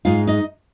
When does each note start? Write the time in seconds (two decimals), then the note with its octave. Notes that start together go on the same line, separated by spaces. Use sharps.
0.05 G#2 G#3 D#4 F4 F5
0.27 D#4 D#5